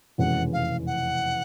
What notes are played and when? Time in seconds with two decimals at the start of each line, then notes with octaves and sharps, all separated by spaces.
0.18 F1 E2 B2 G#3 C#4 F#5
0.53 F5
0.87 F#5